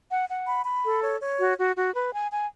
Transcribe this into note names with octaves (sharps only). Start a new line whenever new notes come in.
F#5
F#5
B5
B5
A4
C#5
C#5
F#4
F#4
F#4
B4
G#5
G#5